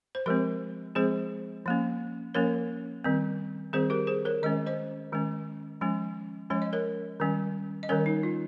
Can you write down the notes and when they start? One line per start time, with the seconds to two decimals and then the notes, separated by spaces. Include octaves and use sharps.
0.15 C5
0.26 F3 G#3 C4 G4 A#4
0.95 F3 G#3 C4 G#4 C5
1.66 F3 A#3 C#4
2.34 F3 A#3 C#4 A#4 C#5
3.04 D#3 G3 C4
3.73 D#3 G3 C4 G#4 C5
3.90 G4 A#4
4.07 G#4 C5
4.25 A#4 C#5
4.43 D#3 G#3 C#4 D#5
4.66 C5 D#5
5.12 D#3 G#3 C#4
5.81 F3 G#3 C#4
6.50 F3 G#3 C#4 C#5
6.62 D#5
6.73 A#4 C#5
7.20 D#3 G3 C#4
7.83 D#5
7.89 D#3 G3 C#4 A#4 C#5
8.06 D#4
8.23 F4